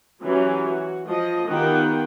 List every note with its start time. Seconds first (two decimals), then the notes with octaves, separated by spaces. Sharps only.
0.22 E3 F#3 C#4 G4
0.69 F#4
1.05 F3 D#5
1.48 D#3 B3 F4 G4 F#5 G5